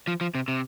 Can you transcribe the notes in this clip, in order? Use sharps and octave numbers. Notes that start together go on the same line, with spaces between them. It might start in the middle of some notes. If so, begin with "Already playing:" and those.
F3
F3
C3
C3